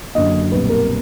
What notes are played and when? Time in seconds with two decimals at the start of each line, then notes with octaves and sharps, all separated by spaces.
0.15 F#2 D3 F#3 A#3 D#5
0.52 B1 A#2 G3 C4 B4
0.69 A#4